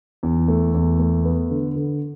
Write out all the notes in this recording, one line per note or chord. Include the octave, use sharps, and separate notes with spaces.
E2
A3
E2
A3
B3
D3
D3